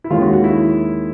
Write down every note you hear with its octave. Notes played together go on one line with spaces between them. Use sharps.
E4
D#2 D#3 G#3 C#4 F4
F#4
F#4
E4